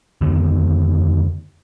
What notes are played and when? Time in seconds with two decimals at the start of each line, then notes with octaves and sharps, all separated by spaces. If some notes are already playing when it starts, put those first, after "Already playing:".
0.21 F2 D3 D#3 B3